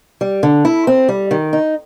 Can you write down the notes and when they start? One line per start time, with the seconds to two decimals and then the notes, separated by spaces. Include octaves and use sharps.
0.21 G3
0.43 D3
0.65 E4
0.87 C4
1.09 G3
1.31 D#3
1.53 D#4